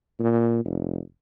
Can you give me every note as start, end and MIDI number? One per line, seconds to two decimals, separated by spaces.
0.20 0.62 46
0.65 0.99 29